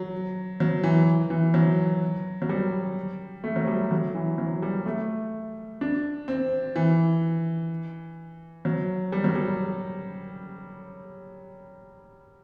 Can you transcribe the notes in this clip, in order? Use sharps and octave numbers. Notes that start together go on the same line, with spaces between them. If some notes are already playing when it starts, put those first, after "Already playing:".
Already playing: F#3
F#3
E3
E3
F#3
F#3
G3
A3
F#3
G3
F#3
E3
F#3
G3
A3
D4
C4
E3
F#3
G3
F#3
G3